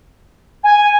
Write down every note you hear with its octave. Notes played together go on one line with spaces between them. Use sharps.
G#5